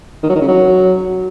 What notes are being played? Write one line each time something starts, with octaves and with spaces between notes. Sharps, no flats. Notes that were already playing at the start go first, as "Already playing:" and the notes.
D#3
F#3
D#3
C#3
F#3